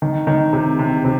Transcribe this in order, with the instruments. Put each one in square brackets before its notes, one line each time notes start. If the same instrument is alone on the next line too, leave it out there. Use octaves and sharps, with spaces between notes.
[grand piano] D#3
D#3
C3
C3
C3